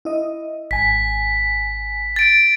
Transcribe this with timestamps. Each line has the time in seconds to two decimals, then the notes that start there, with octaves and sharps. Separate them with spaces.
0.05 E4 D#5
0.71 G#1 G#5 B6
2.16 A6 D7